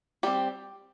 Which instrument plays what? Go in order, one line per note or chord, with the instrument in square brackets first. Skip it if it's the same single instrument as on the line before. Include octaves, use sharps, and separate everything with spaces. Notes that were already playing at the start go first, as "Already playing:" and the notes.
[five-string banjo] G3 C4 G4